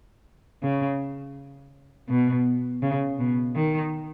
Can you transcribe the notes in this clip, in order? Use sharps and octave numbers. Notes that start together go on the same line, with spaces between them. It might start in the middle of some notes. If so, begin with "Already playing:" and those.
C#3
B2
C#3
B2
D#3